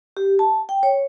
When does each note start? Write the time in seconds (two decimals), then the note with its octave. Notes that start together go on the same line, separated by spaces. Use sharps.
0.17 G4
0.39 A5
0.69 G5
0.83 C#5